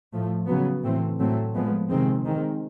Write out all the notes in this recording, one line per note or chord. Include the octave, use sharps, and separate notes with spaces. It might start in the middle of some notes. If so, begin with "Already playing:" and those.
A2 F3 A3
C#3 F#3 B3
A2 E3 A3 C4
A2 F#3 A3 C4
A#2 F3 G#3 B3
C3 D#3 G#3 C4
D#3 G#3 C4